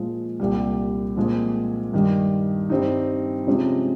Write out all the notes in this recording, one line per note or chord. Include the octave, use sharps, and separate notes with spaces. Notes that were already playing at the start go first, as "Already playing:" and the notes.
Already playing: A#2 F3 G#3
C2 A#2 G3
A#2 F3 G#3 C4
G2 D#3 G3
G2 G3 C4 D#4
C3 F3 G#3 C#4